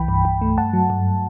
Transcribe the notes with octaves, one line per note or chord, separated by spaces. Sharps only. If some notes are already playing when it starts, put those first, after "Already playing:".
Already playing: C2 E3 G5 B5
G2
G2
A3
G2 F#5 A5
F#3
G2